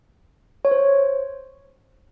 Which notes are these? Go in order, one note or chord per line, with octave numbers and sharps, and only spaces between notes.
C#5
C5